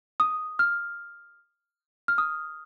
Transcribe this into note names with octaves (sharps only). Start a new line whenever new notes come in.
D#6
F6
F6
D#6